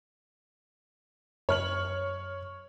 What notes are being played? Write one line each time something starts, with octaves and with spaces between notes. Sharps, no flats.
F#2 C#5 F6 F#7